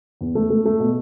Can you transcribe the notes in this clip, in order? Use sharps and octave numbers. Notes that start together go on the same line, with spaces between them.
E2
A3
A3
A3
B2